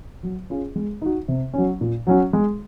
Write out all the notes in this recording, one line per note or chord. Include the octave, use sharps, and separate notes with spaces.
F#3
C#4 F4 G#4
G#3
D#4 F#4
C3
F#3 C#4
A#2
F#3 C#4 F#4
G#3